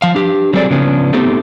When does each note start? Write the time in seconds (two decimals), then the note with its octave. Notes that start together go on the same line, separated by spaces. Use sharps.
0.02 F3 F5
0.15 D4 G4
0.53 F#3 G3 C4 G#4 A4 D5
0.71 C#3 F3 B3 C#4 D4
1.13 A3 B3 C4 D#4 G4